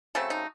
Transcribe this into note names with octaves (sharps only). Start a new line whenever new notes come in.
C#3 F#3 A3 C4 A4
D#4